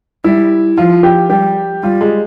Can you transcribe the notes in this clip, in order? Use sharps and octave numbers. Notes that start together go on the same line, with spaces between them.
G3 E4
F3 F4
G4
G3 G4
G3 F4
G#3